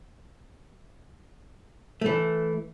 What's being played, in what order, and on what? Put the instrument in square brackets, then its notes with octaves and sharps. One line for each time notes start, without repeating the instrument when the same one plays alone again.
[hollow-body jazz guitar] E3 A3